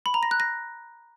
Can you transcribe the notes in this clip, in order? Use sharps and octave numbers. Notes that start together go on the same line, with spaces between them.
B5
A#5
A#6
F#6
A#6